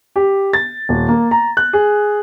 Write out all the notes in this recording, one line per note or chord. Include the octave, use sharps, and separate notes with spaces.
G4
A6
D#1
A#3
A#5
F#6
G#4